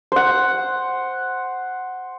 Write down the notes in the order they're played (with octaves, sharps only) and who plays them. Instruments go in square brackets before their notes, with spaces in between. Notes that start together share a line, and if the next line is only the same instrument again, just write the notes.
[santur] C5 F#5